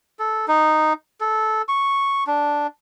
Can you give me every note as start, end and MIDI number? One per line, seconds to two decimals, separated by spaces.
0.19 0.46 69
0.48 0.93 63
1.21 1.62 69
1.68 2.24 85
2.27 2.67 62